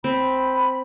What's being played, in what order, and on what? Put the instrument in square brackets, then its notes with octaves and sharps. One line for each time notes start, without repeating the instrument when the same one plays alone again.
[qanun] C4 [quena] B5